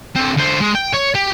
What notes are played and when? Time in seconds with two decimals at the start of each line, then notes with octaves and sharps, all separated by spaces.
0.16 D3 C4
0.37 D3 C5
0.60 G#3
0.75 G5
0.94 C#5
1.15 G4